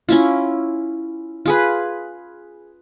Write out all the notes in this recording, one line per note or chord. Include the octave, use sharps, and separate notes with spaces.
C#4 E4 F4
F4 G#4 B4